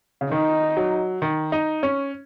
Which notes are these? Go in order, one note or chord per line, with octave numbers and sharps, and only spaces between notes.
C#3
D#3 D#4
F#3
D#3
D#4
C#4